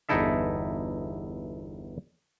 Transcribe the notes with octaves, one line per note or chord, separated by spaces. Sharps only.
G1 E2 D#4 E4 A4 E5